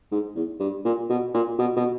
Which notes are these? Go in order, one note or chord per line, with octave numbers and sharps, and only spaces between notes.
G#2
E2
G2
A#2
B2
A#2
B2
B2